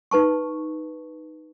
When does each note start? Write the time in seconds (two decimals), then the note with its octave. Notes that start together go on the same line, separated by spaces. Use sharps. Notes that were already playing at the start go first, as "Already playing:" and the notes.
0.11 D#4 B4 A5 C#6